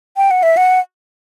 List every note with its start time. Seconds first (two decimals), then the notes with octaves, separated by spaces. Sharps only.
0.17 G5
0.31 F#5
0.43 E5
0.57 F#5